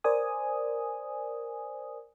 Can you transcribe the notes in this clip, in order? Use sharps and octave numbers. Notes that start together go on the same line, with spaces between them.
A#4 C5 D5 G#5 D#6